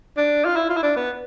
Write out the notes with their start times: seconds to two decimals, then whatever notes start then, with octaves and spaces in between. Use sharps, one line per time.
0.17 D4
0.45 F4
0.56 E4
0.70 F4
0.77 E4
0.83 D4
0.96 B3